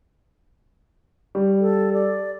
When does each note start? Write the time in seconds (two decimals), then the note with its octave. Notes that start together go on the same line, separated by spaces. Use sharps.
1.35 G3
1.61 A4
1.93 D5